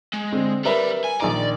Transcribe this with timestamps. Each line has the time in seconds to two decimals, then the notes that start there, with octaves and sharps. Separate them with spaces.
0.13 G#3
0.32 D3 C4
0.65 G3 A#4 B4 E5
1.04 G#5
1.20 A#1 D#3 D5 A#5